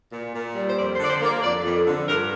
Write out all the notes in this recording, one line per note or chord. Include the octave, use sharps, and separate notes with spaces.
A#2
A#2
G3
C5
F2 D5
C5
D3
D5
C5
A#3 D5
F2 D5
F2
D3
G2 A#4